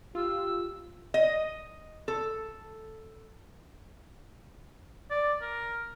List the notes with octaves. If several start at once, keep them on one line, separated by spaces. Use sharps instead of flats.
F4 G4 E6
D#5
A4
D5
A#4